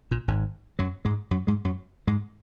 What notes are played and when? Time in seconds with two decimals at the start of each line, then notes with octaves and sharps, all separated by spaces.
0.11 A#1 A#2
0.28 G#1 G#2
0.79 F#2 F#3
1.05 G#2 G#3
1.31 F#2 F#3
1.47 G#2 G#3
1.65 F#2 F#3
2.07 G#2 G#3